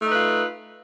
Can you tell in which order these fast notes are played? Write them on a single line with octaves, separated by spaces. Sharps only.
A3 D#4 B4 F4